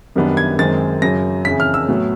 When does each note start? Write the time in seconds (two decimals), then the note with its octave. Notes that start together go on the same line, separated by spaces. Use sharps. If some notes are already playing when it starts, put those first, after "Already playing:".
0.16 F#2 D#3 G3 B3 D4
0.37 G#6
0.59 F#2 D#3 G#3 C4 A6
1.02 F#2 C#3 F#3 A#6
1.45 F2 C#3 E3 B6
1.60 F6
1.74 E6
1.89 A2 F#3 B3